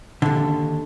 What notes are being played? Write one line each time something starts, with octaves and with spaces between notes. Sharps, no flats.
D#2 D3